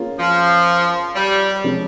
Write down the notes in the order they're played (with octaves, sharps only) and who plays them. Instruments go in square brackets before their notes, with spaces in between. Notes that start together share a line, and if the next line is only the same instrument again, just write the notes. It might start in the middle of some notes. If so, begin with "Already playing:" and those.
Already playing: [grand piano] A#3 C#4 F4 G#4
[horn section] F3
G3
[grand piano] C3 F3 G#3 C#4